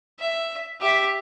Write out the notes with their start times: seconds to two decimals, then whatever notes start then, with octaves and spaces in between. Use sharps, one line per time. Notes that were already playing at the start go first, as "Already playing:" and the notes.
0.20 E5
0.80 G4 E5